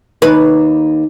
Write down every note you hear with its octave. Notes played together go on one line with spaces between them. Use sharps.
D#2 B4